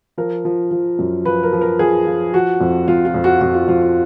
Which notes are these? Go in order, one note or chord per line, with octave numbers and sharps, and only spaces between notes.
F3 A#4
F3
F3
F#2
F3 B4
A#4
F3
A#4
F3 G#4
F3
F3 F#4
F2
F2 F4
F4
F2
F#4
F2 F#4
F4
F2 F4
F4